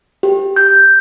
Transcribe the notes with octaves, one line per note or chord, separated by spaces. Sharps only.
G4
G6